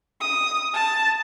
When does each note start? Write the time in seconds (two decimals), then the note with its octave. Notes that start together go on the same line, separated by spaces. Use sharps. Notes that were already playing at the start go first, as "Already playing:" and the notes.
0.20 D#6
0.74 A5